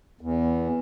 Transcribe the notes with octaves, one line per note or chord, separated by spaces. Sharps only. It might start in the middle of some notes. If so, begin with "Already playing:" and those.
E2